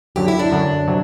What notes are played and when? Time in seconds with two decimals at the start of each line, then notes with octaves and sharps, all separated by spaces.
0.16 F#2 D3 F#3 G4
0.28 E4
0.39 D4
0.52 F#2 D3 F#3
0.88 C3 F#3